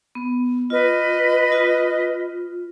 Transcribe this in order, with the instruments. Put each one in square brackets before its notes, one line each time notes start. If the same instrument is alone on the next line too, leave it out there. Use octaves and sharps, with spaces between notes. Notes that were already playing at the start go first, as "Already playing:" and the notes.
[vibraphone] B3
[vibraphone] F4 [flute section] B4 D#5
[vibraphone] F4